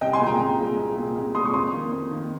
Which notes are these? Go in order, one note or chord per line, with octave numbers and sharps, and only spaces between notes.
C2 D#5 G5
G#5 C6
A#2 G#3
G5 A#5
C2
A#2 G#3
C2
A#2 G#3
C2
A#2 G#3 C6 D#6
C#6
F2 C6 D#6
D#3 A#3
F2
D#3 A#3